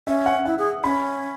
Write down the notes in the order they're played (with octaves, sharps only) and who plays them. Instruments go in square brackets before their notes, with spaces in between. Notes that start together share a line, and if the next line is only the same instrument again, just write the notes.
[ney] C#4 [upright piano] E5
[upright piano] F#5
[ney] E4 [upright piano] F#5
[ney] G#4
[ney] C#4 [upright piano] B5